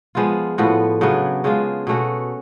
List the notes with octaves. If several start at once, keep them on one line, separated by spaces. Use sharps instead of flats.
F3 G#3 B3 F4
A2 F3 B3 F#4
C#3 F#3 B3 D4
C#3 G#3 D4 F4
B2 A3 C#4 F#4